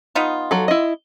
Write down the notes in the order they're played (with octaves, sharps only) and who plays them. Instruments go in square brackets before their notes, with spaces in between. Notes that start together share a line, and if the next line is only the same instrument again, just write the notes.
[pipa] B3 D#4 F4
[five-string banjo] F#3 A4
E4 D#5